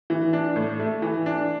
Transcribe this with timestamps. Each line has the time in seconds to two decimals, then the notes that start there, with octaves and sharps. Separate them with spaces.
0.10 E3
0.33 D4
0.56 A2
0.80 A3
1.02 E3
1.26 D4